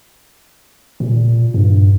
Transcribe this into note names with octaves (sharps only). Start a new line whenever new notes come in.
A#2
G2